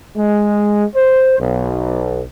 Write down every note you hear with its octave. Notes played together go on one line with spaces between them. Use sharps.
G#3
C5
B1